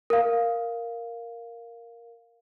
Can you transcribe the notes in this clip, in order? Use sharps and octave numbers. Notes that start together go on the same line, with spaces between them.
A#4 F5